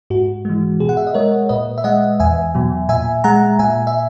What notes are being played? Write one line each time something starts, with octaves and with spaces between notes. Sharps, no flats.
G#2 F#4
E3 G#3
B2 G#4
F#5
E5
D#5
G#3 A#4 C#5
A#2 B4 D#5
E5
G#3 D#5 F#5
E2 E5 G#5
B2 F#3
A#2 E5 G#5
G#3 F#5 A#5
A#2 E5 G#5
E5